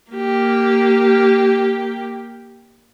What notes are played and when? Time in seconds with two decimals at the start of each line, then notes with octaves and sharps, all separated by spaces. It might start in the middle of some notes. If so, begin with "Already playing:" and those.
0.12 A#3 G4